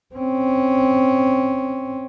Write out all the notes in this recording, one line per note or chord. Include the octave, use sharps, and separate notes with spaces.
C4 C#4